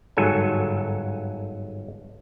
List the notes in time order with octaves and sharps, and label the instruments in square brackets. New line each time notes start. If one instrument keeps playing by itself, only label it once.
[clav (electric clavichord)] G1 G#2 F#3 A4 G#5